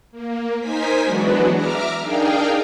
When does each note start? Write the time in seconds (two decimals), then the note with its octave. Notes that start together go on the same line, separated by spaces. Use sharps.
0.11 A#3
0.59 D#4 A#4 C5 G#5 B6
1.02 E3 F#3 G#3 B3 D4 F#4
1.53 E5 A#5 D6 F6
1.99 D4 D#4 G#4 A#4 F5 G5